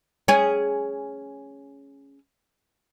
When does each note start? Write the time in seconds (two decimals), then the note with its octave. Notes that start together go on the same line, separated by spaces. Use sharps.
0.28 C#4 G#4